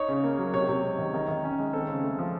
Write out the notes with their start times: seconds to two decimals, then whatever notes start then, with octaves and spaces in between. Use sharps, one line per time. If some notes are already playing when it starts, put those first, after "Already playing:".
Already playing: D#4 C#5
0.08 C#3
0.24 A#3
0.39 F#3
0.54 C3 C#5
0.68 C3
0.83 G#3
0.98 D#3
1.14 D#3
1.28 D#3
1.44 C#4
1.59 G#3
1.73 C4 A4
1.88 C#3
2.03 A3
2.19 F3